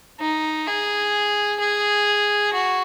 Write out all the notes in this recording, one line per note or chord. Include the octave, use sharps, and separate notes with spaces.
D#4
G#4
G#4
F#4